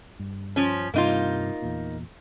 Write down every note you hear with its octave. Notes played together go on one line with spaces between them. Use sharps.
G2
F3 C#4
G2 C3 A#3 D#4 F4
E2 A#2